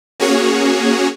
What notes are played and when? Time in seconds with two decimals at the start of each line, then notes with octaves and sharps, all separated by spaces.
0.20 A#3 C#4 F#4 G#4 C#5